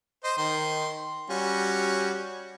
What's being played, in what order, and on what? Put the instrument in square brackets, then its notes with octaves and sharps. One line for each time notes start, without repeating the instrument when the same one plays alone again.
[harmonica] C5 D#5 C6
D#3 C6
G3 C#4 F#4